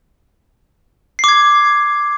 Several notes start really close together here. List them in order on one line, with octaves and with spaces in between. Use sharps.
C7 D6 G#6